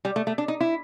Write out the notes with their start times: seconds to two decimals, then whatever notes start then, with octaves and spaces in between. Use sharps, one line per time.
0.05 G3
0.16 A3
0.27 A3
0.38 D4
0.48 D#4
0.61 E4